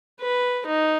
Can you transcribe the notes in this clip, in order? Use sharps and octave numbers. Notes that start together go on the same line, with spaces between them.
B4
D#4